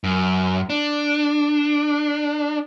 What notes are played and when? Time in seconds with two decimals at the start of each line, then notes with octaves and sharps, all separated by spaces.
0.04 F#2
0.70 D4